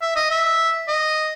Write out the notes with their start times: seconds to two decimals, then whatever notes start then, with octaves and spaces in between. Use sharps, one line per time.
0.02 E5
0.16 D#5
0.31 E5
0.88 D#5